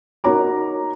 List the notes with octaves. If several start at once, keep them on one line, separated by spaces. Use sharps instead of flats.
D#4 F#4 A#4 C#5 A#5 D6